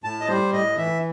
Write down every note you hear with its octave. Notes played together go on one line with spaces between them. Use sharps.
A2 A5
D#5
G3 C5
A2 D#5
E3 E5